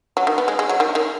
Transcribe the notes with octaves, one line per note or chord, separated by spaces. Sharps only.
F#3
D#3
B3
G#3
G#3
F#3
D#3
D#3